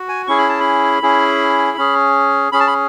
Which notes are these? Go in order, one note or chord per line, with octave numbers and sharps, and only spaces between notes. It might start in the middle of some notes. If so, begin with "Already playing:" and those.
Already playing: F#4
G#5
C#4 E4 G#4 C#6
B5
A5
B5
C#4 E4 G#4
C#4 G#4
C#4 G#4 B5
A5
B5